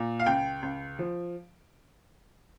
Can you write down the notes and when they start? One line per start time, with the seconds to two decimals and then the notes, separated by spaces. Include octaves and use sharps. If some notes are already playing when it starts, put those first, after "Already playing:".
Already playing: A#2
0.19 F5
0.26 C#2 G5
0.62 C#2
0.99 F3